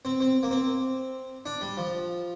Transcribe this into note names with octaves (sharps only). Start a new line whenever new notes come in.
C4
C4
A#3
C4
D4
G3
F3